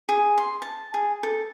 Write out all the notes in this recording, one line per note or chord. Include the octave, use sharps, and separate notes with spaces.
G#4
C6
A5
G#4
A4